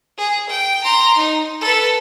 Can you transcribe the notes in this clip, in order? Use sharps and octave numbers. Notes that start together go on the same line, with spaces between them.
G#4
G5
A#5 C6
D#4
A4 B4